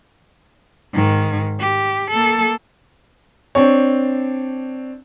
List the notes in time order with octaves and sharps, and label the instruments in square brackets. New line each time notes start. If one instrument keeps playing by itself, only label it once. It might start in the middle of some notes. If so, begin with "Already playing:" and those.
[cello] G#2 D#3
G4
A#3 A4
[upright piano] C4 D4 C#5